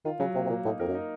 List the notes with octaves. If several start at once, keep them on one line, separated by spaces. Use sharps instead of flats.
D#3 F4
C#3 F#3
C3 A#3
C3
A#2 A#3
A2 D#4
F2 A#4
F#2
D#4